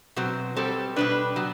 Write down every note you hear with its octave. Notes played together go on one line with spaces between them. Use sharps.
B2 F#3 C4
B2 G3 C4 G4 A4
B2 G3 D4 B4
F#3 B3